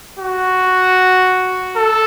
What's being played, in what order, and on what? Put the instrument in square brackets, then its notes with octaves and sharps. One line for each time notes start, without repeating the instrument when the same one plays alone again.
[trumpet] F#4
A4